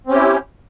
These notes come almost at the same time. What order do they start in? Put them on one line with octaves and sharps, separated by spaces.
C4 C#4 G4 E4